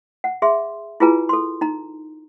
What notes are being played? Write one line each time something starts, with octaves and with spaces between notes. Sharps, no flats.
F#5
G#4 E5 C6
E4 F4 G#4 B4 G#5 A#5
A4 C6
D#4 A#5